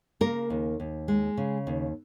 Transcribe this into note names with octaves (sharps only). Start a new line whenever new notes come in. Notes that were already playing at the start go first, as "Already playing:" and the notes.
C#3 A#3 A#4
D#2
D#2
G#3
C#3
D#2